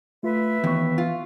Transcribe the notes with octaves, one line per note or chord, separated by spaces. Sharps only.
A3 F4 B4 E5
D#2 E3 B3 C#6
F4